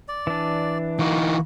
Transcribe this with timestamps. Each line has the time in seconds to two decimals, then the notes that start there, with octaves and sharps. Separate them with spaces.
0.08 D5
0.27 E3 D4
0.99 E3 A#3 D#4 F#4